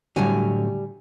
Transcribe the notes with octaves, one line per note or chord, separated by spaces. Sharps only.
A2 D3 F#3 G3 G#5